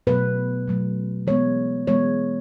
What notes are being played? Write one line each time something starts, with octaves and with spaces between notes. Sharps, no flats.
B2 F#3 A3 B4
B2 F#3 A3
E3 G#3 B3 C#5
E3 G#3 B3 C#5